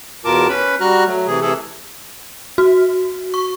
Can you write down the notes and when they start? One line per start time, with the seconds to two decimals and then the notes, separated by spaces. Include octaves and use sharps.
0.25 E2 B2 F4 A#4 A5 D6
0.49 C#4 B4 B5
0.81 G3 F#4 A#5 F6 F#6
1.06 F#3 A3
1.27 C3 E3 A3 G#4
1.41 C3 E3 A3 G#4 A4
2.58 F#4
3.34 C#6